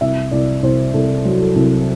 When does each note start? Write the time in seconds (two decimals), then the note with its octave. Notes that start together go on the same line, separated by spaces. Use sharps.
0.01 C2 E5
0.31 C2 D5
0.63 C2 C5
0.94 C2 A4
1.25 F#3
1.40 A4
1.56 C2